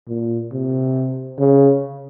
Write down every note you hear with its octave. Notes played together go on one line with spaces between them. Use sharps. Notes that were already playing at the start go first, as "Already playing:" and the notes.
A#2
C3
C#3